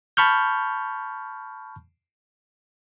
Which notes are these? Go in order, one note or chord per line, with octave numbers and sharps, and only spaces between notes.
A5 B5 C#6 F6 G6